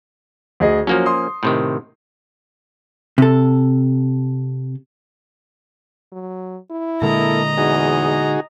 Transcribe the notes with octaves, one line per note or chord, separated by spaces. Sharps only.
D2 G#4 D#5
F3 F#3 A#3 C#4
C6 D#6
A2 C3 D#3
C3 A4
F#3
E4
A#2 D3 G#3 A#3 A4 D#5 A#5
E2 D#4 F#4 G#4